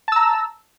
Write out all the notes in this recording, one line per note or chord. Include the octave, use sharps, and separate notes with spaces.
A5 A#5 E6